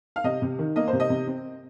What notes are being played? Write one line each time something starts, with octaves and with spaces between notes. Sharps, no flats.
F5
C3 D#5
C3
D#3
A#3 D#5
C5
C3
D#5
C3
C4